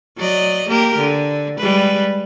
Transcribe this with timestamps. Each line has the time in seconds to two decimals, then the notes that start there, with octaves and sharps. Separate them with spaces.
0.17 F#3 D5 D#5
0.69 A#3 G4 A#4
0.98 D3
1.58 G3 G#3 B4